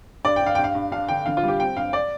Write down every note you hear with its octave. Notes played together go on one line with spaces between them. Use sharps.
G2 D5
G2 G5
F5
G2 G5
F5
G2
D4 F5
D3 G5
D3 F5
F4
G3 G4
C4 G5
G2 F5
D5